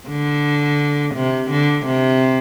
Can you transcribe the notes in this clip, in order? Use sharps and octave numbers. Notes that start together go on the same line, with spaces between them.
D3
C3
D3
C3